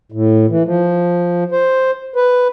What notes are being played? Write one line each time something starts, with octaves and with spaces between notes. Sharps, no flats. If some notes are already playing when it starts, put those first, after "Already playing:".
A2
E3
F3
C5
B4